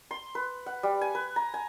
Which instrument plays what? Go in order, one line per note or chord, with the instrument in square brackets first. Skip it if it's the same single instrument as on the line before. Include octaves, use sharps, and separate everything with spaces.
[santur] C6
B4
F#5
G3
G#5
B4
A#5
G#5